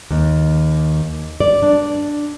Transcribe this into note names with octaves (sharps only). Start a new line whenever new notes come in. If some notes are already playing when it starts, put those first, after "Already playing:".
D#2
D5
D4